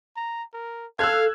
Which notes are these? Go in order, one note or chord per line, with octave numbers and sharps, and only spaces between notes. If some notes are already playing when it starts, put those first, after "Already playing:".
A#5
A#4
A4 F5 E6 F#6 G#6